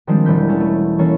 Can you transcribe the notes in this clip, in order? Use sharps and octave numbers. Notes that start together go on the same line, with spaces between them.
D#3 F3 G3 G#3 C4 D4
E1 E3 G6 B6
B3 C#4 A4
A3
E3 A#3 C#4 A4 C#5